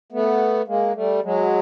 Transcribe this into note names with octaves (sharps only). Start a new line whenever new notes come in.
A3 B3
G#3 A#3
G3 A3
F#3 G#3